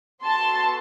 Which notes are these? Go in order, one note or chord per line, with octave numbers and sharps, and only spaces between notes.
B3 F#4 A4 A5 C6